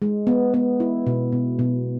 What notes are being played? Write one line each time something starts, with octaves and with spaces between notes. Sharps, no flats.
G#3
B3
B3
E4
B2
B2
B2